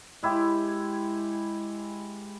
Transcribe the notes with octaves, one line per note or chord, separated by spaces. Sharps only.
G#3 E4 G4